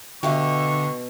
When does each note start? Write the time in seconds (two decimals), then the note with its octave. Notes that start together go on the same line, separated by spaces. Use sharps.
0.23 B2 D3 G4 E5 F5 C#6